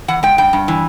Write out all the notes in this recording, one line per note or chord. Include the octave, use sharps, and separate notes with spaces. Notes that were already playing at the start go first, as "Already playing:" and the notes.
E3 F#5
G#3 G5
G2 G5
G2
E3